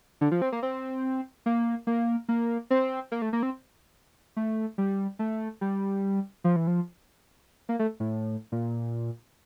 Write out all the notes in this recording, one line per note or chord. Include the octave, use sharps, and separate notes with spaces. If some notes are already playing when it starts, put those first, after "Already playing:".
D3
F3
C4
A#3
C4
A#3
A#3
A#3
C4
A#3
A3
A#3
C4
A3
G3
A3
G3
F3
E3
F3
A#3
A3
A2
A#2